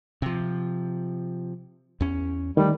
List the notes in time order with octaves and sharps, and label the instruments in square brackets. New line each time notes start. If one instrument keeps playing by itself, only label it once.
[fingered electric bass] C3 F3
E2 C#4
[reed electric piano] D#3 [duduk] G3 [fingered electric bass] A3